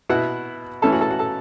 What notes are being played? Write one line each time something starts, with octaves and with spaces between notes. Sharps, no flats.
B2 B3 E4 F#4 F#5
E3 A3 C#4 E4 A4 A5
F#4 F#5
A4 A5
F#4 F#5
A4 A5